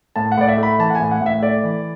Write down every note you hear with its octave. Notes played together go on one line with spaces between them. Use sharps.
A2 A5
F#5
A2 D5
E5
A3
B5
E3 A5
F#5
A2 G#5
F#5
A2
E5
A3 D5
E3